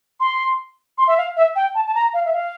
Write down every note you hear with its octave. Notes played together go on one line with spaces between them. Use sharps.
C6
C6
E5
F5
E5
G5
A5
A5
A#5
F5
E5
F5